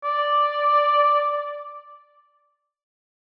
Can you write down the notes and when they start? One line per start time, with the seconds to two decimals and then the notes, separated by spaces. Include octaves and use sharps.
0.04 D5